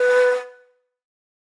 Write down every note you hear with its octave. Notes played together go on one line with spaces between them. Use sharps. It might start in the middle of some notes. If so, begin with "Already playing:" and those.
Already playing: B4